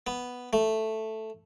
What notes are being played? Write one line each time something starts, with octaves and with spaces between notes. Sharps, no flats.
B3
A3